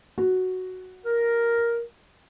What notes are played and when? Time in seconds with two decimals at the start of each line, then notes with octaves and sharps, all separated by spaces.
0.18 F#4
1.05 A#4